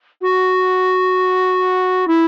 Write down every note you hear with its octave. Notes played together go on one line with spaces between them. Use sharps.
F#4
E4